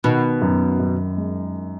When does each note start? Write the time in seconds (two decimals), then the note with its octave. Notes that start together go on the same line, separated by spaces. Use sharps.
0.04 B2 D#3
0.42 F#2
0.80 F#2
1.17 G#3